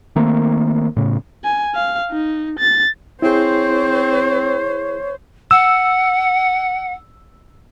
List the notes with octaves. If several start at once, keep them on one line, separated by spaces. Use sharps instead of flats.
D#3 A3 A#3 C4
A2 C#3
G#5
F5
D#4
A6
C4 E4 G#4 C5 C#5
F#5 E6